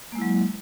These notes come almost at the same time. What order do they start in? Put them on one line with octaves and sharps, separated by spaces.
A#3 G#3 E4 F#3